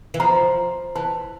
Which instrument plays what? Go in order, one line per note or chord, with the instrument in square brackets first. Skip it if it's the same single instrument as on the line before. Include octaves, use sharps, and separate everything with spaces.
[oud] E3
[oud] F3 [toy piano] A#5
[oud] E3 [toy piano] A5